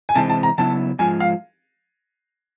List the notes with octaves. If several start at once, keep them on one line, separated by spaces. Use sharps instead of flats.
G#5
C3 E3 G#3 C4 A5
A5
A#5
C#3 F#3 B3 E4 A5
G#2 F3 G#3 G#5
F5